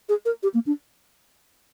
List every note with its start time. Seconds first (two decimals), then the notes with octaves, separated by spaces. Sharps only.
0.09 G#4
0.25 A#4
0.43 G4
0.54 A#3
0.66 D4